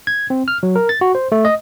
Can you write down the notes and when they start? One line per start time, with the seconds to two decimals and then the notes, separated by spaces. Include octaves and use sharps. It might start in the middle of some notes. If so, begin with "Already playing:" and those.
0.07 G#6
0.30 C4
0.48 F6
0.63 F#3
0.76 A#4
0.89 A6
1.01 F#4
1.15 C5
1.32 A3
1.45 D#5